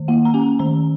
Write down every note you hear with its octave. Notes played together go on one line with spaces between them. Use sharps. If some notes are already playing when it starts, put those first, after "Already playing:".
Already playing: D#3
A#3 F#5
A#5
C#4 G#5
D#3 A#5